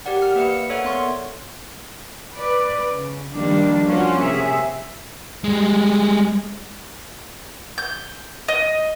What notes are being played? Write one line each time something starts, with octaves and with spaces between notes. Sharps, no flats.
G4 A#4 D5 F#5
F6
A#3 B4 E5 C#7
F5 C#7
A4 A#4 C#5 D5 E5 F#5
B3 C6 C#6
B4 D5
C#3
D#3 F3 G3 A#3 D4
F3 A#3 C#4 F4 F#4 C5
C3 G#4 E5
G3 G#3
G6
D#5